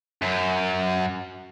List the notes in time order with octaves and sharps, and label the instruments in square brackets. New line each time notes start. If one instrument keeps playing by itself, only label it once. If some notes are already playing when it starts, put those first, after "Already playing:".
[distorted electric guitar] F#2